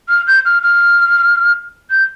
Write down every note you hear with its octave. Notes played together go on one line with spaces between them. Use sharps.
F6
G6
F6
F6
G6